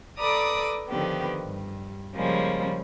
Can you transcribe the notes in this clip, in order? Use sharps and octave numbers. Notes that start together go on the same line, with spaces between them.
A4 B4 D5 A#5 D6 D#6
D3 D#3 F3 B3 G4 B4
G2
C#3 F3 G3 G#3 A#3